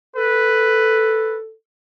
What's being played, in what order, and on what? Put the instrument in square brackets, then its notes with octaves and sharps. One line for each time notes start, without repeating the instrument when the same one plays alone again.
[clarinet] A4 [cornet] B4